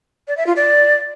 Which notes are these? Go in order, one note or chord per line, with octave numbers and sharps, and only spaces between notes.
D5
E5
F4
D5